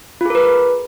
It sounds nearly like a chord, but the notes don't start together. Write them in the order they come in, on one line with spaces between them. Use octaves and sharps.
F4 G#4 A#4 B4